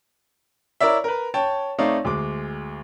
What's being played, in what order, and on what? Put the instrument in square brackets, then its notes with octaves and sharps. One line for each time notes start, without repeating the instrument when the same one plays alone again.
[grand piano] E4 A#4 C#5 D5 E5
A#4 B4
C#5 G5 A5
A3 C4 D#4 C#5 D5 F5
D2 G#3 D6